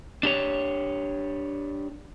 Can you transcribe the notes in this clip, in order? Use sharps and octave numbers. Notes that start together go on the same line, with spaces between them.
D4 G4 C#5